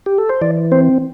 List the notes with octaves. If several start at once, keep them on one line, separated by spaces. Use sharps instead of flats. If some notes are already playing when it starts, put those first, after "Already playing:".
G4
A4
C5
E3 D5
C4 C5